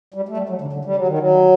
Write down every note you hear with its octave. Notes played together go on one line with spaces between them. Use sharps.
G3
A3
G3
F#3
D3
D3
G3
F#3
D#3
F#3